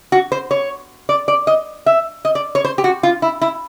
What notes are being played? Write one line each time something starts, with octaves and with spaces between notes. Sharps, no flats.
F#4
C5
C#5
D5
D5
D#5
E5
D#5
D5
C#5
C5
G4
F#4
F4
E4
E4